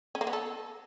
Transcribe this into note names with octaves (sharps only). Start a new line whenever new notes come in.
C#4
A#3
B3
A4